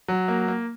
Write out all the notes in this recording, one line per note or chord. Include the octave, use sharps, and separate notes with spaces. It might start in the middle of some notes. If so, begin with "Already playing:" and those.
F#3
A#3
A#3